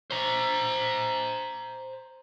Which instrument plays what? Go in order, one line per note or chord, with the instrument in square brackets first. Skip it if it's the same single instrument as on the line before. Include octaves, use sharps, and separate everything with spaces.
[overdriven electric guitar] C5 A#5